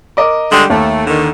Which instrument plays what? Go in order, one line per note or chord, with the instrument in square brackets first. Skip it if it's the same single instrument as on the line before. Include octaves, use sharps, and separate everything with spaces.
[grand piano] A#4 D#5 D6
[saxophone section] D3 G3 G#3
[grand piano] D#2 [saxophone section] A3
[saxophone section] D3 D#3